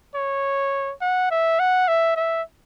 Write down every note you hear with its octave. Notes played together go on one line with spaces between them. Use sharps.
C#5
F#5
E5
F#5
E5
E5